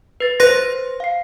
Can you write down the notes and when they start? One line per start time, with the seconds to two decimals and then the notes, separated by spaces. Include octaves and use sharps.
0.20 B4 A6
0.40 B4 C5 C6 A#6
1.00 F5 C7